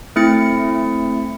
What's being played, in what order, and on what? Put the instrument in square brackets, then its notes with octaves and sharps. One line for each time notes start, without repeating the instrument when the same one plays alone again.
[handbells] A3 C4 E4 A6 C#7